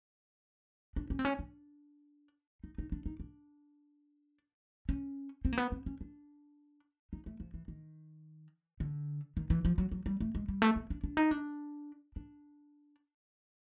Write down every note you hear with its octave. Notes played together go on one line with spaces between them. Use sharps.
D4
C#4
C4
C#4
D4
D#4
D#4
D4
D#4
D4
C#4
C4
A#3
B3
C4
C#4
D4
D#4
A3
F3
E3
D#3
D3
D#3
E3
F3
F#3
F#3
G3
A3
G#3
G3
A3
A#3
D4
D4
D#4
D4
D4